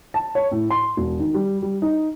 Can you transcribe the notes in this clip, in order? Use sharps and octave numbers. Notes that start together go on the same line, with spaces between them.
A5
C#5
A2
C6
E1
D#3
G3
G3
D#4